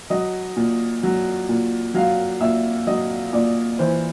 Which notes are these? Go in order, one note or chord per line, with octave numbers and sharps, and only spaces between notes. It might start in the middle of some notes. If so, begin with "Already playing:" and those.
F#3 D#5
A#2
F#3
A#2
F#3 F5
A#2 E5
F#3 D#5
A#2 D5
E3 C5